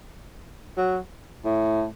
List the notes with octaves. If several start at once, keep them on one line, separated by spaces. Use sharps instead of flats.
F#3
A2